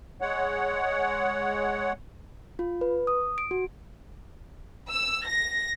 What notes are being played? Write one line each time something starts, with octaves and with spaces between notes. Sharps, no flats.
G#3 C#5 F#5
F4
B4
D#6
D7
F#4
E6
A#6